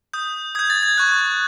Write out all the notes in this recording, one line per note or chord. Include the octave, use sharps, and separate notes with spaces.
D#6 G6
D#6 G6 G#6
A6
G#6
C#6 F#6 G#6